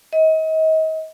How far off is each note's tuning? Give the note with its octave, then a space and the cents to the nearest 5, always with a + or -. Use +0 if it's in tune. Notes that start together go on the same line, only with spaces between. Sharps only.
D#5 +35